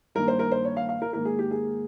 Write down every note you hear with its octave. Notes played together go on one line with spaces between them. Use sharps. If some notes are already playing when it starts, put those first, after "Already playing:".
G2 D#3 A#3 A#4
C5
A#4
C5
C#5
F5
F5
A#4
G#2 D#3 A#3 A#4
G#4
G4
G#4